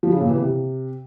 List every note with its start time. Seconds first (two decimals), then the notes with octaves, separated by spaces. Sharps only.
0.03 F3
0.12 C#3
0.20 A#2
0.29 E3
0.38 C3